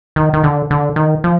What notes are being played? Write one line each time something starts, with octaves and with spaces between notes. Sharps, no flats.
D#3
D#3
D3
D3
D#3
F3